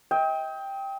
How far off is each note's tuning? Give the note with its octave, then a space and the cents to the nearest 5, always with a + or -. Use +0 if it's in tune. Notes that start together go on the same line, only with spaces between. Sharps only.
D#5 +40 G5 +5